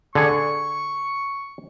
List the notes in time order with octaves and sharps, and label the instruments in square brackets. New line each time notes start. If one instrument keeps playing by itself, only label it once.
[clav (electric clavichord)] D3 G#4 [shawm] C#6